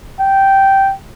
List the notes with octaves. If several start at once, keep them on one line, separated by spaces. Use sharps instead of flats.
G5